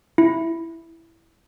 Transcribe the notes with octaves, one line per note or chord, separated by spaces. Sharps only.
E4